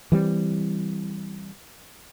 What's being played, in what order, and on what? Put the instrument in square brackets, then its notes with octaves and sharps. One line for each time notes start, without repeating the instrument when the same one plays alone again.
[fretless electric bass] E3 G3 C4